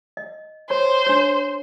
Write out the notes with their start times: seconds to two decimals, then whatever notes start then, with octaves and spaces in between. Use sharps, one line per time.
0.17 D#5
0.70 C5 C#5
1.07 D4 C#5